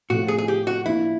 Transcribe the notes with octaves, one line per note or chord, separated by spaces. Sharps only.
A2 F3 A3 F#4
G#4
G#4
G4
F#4
F3 A#3 D4 E4